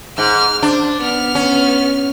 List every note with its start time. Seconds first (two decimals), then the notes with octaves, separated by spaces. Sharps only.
0.18 G#2 F6
0.62 D4 C5
1.01 B3 F6
1.35 C#4